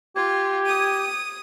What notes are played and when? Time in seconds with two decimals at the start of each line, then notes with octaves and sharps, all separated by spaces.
0.16 F4 G4 G#6
0.66 D#6 D#7